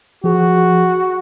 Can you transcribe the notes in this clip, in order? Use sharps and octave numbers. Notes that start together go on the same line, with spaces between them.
F3 F#4 G#4